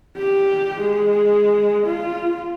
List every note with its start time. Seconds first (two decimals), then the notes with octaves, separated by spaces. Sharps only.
0.18 G4
0.82 G#3
1.87 F4